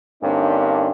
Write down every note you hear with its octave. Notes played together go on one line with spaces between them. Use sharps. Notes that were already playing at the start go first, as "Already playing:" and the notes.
G2 D3 A#3 C4 C#4 D#4